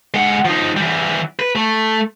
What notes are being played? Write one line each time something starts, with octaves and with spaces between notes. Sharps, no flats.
G#3 F#5
F3 D#4
E3 G3
B4
A3